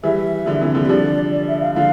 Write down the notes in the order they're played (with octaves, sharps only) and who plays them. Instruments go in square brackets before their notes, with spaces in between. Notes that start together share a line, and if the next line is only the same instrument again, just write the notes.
[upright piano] E3 G3 [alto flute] E5
[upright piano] D3 F3
C3 E3
D3 F3
G3
[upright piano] D3 F3 [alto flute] D5
[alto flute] D5
E5
F5
[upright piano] D3 F3 [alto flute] F5